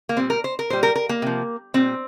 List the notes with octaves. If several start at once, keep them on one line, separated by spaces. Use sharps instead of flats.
A#3
A#2 G3 C4
A#4
C5
A#4
A#2 G3 C5
A#4
A#4
A#3
C3 F3
A#2 G3 C4